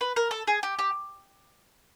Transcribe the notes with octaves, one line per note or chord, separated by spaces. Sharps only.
B4
A#4
A4
G#4
G4
G4